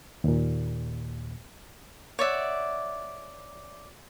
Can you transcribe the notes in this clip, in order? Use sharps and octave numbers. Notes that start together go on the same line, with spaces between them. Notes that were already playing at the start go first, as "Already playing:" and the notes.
D#2 A#2
C#5 D5 E5 F#5